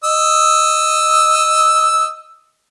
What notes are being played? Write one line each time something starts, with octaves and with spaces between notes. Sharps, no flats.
D#5 E6